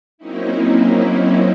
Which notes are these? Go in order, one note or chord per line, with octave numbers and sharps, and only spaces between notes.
F#3 A#3 C4 C#4 D#4 E4